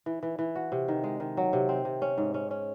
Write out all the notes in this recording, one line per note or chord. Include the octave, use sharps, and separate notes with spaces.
E3
E3
E3
F#4
C3
D#3
G#3
D#3
F#3
C3
C4
C3
C#4
G#2
C#4
C#4